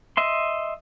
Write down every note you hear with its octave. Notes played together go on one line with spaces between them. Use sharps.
D#5 E5 C6